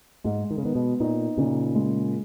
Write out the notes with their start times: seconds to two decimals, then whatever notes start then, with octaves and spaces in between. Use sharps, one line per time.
0.24 G#2 G#3
0.51 D#3
0.58 C#3
0.63 D#3 B3
0.75 B2
1.00 A#2 D#4
1.38 A#2 C#3
1.75 G#3